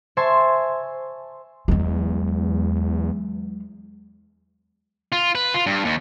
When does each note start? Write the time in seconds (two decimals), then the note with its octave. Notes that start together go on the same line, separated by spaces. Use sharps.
0.17 C5 E5 G#5 A5 C6 C#6
1.68 E2 F#3 G#3
5.12 F4
5.35 B4
5.54 F4
5.66 G2
5.85 D#2